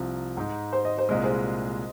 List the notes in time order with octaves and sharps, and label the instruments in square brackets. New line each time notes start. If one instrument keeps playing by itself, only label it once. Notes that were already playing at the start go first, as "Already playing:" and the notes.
Already playing: [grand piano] C2 C3 F3
G#2 G#3 D#4
[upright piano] C5
D#5
C5
[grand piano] C2 A#2 G#3 [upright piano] D#5
[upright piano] G#4 C5